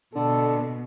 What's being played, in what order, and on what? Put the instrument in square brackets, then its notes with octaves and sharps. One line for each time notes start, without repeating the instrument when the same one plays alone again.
[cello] B2 [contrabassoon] D3 [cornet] A4